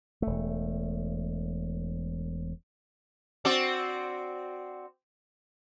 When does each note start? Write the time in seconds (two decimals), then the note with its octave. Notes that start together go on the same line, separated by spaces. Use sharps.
0.22 E1 A3
3.45 C4 F#4 D5